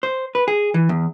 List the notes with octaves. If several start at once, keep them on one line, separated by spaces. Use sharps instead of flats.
C5
B4
G#4
E3
E2